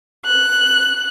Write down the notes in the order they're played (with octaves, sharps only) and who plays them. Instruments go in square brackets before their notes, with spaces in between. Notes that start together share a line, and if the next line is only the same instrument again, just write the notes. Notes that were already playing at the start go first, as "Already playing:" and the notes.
[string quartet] F#6